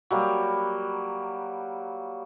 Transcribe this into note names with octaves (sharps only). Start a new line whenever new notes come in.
F#3 G3 A#3